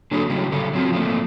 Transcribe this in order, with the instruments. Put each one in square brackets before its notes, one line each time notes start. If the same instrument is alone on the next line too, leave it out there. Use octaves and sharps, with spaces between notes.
[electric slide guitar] D3 F#3 A#3 D4 G#4 A4
C#3 F#3 G3 C#4
C#3 G4 A4
F#3 C4 F4
F3 A3 A#3 C4